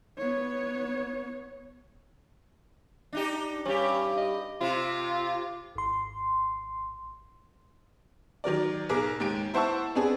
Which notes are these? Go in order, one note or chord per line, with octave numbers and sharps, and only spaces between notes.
B3 C#5
D4 D#4 G4
G2 C#4 G4
D#5
C3 F4
G#1 C6
D#3 F#3 A#4 D5
B1 G#4 A#4 D6
D#2 G#3 G4 D7
E4 C5 F#5 A5 C#6 E6
B3 C4 D4 G#4